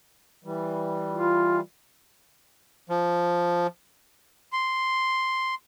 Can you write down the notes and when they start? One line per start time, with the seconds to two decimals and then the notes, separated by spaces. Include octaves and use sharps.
0.44 E3 G3
1.13 F4
2.89 F3
4.53 C6